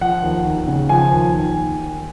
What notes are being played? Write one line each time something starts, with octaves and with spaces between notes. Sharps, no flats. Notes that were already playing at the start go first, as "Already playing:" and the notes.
F3 F#5
D#2
D#2
C#3
F3 G#5
D#2
D#2